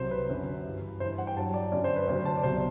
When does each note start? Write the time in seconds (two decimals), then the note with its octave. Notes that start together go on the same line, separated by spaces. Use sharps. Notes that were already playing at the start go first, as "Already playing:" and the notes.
Already playing: C2 C3 F#3 C5
0.11 B4
0.29 F#2 D3 F#3
0.66 G2 E3
1.00 G2 E3 C5
1.18 F#5
1.27 G5
1.37 G2 F#3 A5
1.54 D5
1.72 F#2 D3 F#3 D5
1.84 C5
1.96 B4
2.07 D2 C3 F#3 C5
2.25 A5
2.37 D5
2.43 C2 B2 F#3 C5